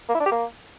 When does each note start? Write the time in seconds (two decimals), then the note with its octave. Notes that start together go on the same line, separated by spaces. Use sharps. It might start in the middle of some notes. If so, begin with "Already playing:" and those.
0.09 A#3
0.14 E4
0.20 D4
0.26 G4
0.31 A#3